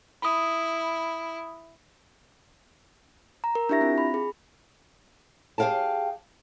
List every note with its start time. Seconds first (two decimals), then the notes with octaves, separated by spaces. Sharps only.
0.22 E4 B5 D#6
3.44 A#5
3.55 A#4
3.69 D4 E4 G4 E5 A#6
3.81 C4 F4
3.98 B5
4.14 G#4
5.58 G4 G#4 C#5 F5 G5 A5